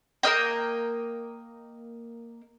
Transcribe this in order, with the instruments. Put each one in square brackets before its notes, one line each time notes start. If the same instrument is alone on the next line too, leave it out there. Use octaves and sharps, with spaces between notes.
[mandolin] A#3 A#4 D#5 G5